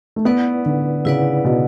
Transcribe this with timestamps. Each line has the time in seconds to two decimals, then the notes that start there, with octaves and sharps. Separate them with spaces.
0.16 A3
0.25 B3 E4 B4 D5 F#5
0.66 D3
1.05 C#3 E4 B4 D5 F#5
1.44 B2